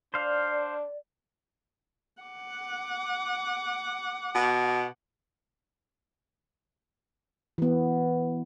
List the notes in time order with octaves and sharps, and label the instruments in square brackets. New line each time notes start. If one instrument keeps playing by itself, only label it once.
[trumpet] D4 [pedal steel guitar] C5 F5 [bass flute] D5
[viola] F#5 D6
[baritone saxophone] B2
[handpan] E3 B3